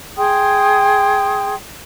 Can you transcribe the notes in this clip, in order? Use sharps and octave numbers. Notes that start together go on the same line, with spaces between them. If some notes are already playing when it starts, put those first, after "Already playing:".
G#4 G5 C6 D#6